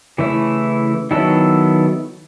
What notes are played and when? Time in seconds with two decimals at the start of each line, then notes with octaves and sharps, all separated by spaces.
0.18 C#3 E3 A3 E4
1.11 D#3 F#3 B3 E4 A4